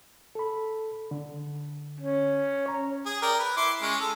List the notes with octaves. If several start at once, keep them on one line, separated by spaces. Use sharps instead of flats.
A4 B5
D3
C#4
C#5 A#5
G#4
A#4 D5 G5
B4
E4 C6 D6
G#3 C#4
A4